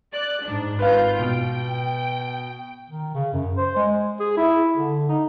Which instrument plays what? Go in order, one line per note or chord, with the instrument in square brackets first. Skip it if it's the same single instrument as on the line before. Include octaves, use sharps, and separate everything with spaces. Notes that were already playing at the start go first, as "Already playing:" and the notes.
[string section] D5 F#6
G#2 D4
[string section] G#1 F4 G6 [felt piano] B4 F5
[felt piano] B2 [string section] G5
[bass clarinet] D#3
C#3
F#2
C5
G#3
G#4
E4
D3
D#4